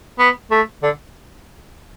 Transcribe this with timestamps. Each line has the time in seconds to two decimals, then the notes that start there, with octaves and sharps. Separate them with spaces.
0.19 B3
0.51 A3
0.83 D3